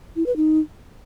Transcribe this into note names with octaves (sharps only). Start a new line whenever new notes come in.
E4
B4
D#4